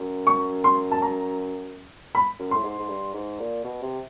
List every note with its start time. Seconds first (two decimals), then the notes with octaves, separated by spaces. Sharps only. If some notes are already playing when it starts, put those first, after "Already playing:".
Already playing: F#2
0.27 C#6
0.64 C6
0.91 A5
1.02 A#5
2.15 B5
2.39 F#2
2.51 A2 C6
2.64 G#2
2.79 G#2
2.89 G2
3.14 G#2
3.39 A#2
3.64 B2
3.82 C3